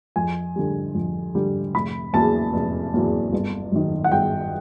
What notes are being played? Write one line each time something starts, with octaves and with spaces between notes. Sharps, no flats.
F2 G#5
D3 G3
F2
D3 G3
F1 B5
E2 C#3 F#3 A#3 A5
F1
E2 C#3 F#3 A#3
G1
F#2 D#3
F#5
G1 G5